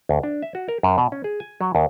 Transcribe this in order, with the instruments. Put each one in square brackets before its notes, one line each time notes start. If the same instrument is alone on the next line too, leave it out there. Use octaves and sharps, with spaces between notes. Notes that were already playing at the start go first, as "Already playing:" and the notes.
[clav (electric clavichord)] D2
D4
E5
F#4
A#4
F#2
B2
C#4
G#4
G#5
F#3
D#2